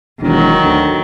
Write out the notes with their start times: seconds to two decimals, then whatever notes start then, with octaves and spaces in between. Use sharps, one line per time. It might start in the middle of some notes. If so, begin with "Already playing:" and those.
0.22 E1 D#3 F#3
0.64 D2